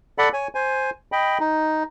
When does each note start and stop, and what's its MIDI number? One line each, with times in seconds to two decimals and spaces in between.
0.18 0.29 69
0.18 0.29 74
0.18 0.29 78
0.18 0.29 83
0.33 0.48 73
0.33 0.48 80
0.55 0.90 72
0.55 0.90 80
1.12 1.38 75
1.12 1.38 79
1.12 1.38 83
1.40 1.83 63